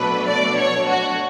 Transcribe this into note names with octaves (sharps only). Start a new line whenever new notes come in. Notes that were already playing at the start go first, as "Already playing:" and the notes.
Already playing: B2 F#3 A3 D4 B4
D5
C#5
F#4